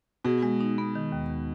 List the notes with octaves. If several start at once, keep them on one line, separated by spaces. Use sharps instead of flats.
B2 G#4
G#3
D#4
B3
D#3
D#2
D#3